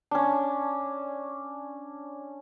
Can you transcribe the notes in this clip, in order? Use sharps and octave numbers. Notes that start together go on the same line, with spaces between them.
C#4 D4